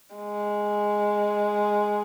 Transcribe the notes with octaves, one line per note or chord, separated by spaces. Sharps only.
G#3